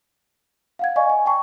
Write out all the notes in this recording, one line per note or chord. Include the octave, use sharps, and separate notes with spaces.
F5 F#5 G#6
D5 D#5 F5 G#5 C#6
G#5
G5 A5 C#6